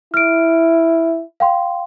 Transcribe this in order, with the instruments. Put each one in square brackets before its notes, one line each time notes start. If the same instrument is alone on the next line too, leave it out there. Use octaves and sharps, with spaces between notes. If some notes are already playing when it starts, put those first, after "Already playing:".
[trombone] E4 [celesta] F6 D7
[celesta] F5 G5 C6